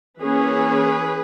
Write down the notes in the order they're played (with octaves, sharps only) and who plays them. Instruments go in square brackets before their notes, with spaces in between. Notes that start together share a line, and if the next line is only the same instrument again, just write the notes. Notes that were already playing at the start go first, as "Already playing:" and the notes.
[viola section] E3 A#3 C#4 G#4 B4